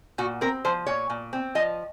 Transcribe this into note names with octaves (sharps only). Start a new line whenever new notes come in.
A#2 F#4
C4 A#4
F3 C5
A#2 C#5
A#2
C4
F3 D#5